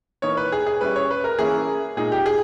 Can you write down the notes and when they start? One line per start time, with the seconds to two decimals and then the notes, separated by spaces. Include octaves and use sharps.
0.22 E3 A#3 D#4 C#5
0.37 B4
0.52 G#4
0.67 G#4
0.81 G3 C#4 E4 B4
0.96 C#5
1.10 B4
1.24 A#4
1.39 E3 A#3 C#4 E4 G#4
1.97 A#2 G#3 D#4 G#4
2.12 G4
2.26 G#4